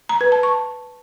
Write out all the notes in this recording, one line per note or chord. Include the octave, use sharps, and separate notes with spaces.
A#5
B4
A5
C#6